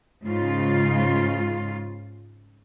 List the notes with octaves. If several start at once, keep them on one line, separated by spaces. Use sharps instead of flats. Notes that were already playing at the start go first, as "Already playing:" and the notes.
G#2 C#3 F4